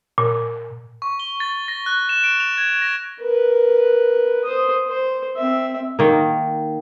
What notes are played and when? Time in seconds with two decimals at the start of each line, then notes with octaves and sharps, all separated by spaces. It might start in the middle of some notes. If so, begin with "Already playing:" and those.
0.18 A#2
1.02 C#6
1.20 G7
1.40 A6
1.68 A#6
1.86 F#6
2.09 E7
2.24 D7
2.40 F7
2.58 G#6
2.82 A#6
3.20 A#4 B4
4.44 C5 D#6
4.88 C5
5.36 C4 E5
5.99 D#3 A#3